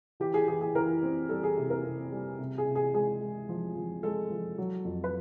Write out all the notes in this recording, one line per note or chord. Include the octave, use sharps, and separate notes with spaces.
E3 G4
G#4
E3 G#4
G#4
E3 A#4
C4
G3 A4
G#4
C3
A#4
C3
G3
C3
G#4
C3
G#4
G#3 G#4
G#3
F3
F3
G#3 A4
F3
F#3
F2
B4